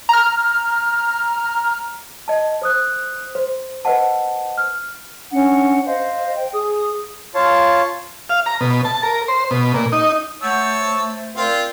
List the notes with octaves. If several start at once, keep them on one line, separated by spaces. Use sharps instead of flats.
A#5 F6
D#5 A5
C5 D#6 F#6
C5
B4 C5 D#5 F#5 A5
F6
C#4 D4 F#5
C5 D#5 F5
G5
G#4 D#6
F4 C#5 F5 A5
F5
A#5
B2
A5
A#4
C5
B2
A#2
D#4
A3 C#5 F#5 A5 E6 G6
C5
C4 F4 A#4 D5